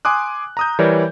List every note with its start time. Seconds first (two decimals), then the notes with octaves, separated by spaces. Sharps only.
0.05 G#5 C6 D6 D#6 F#6
0.57 A#5 D#6 G6
0.79 E3 G3 A#4 C#5 D5